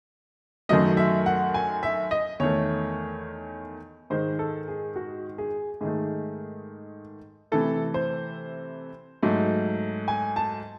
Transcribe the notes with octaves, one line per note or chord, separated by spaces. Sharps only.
F#2 D#3 F#3 A3 D#5
E5
F#5
G#5
E5
D#5
E2 D#3 A3 C#5
G#2 D#3 G#3 C5
A4
G#4
F#4
G#4
G#2 D#3 A3 G#4
C3 E3 A3 A4
C5
G#2 F#3 A3
G#5
A5